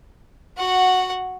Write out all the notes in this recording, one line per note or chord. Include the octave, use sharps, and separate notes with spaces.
F#4 F#5